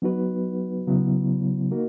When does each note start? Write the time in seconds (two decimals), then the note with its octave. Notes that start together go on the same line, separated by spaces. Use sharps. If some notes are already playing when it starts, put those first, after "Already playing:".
0.02 F#3 B3 D#4 F#4 B4
0.87 C#3 F#3 B3 E4
1.71 A#3 D#4 F#4 A#4